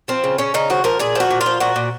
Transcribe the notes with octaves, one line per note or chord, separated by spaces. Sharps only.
F3 C4
C#3
C#3 C#4
C#3 D#4
F3 F#4
F3 A#4
A#2 G#4
F3 F#4
A#2
F4
F3
A#2 F#4
A#2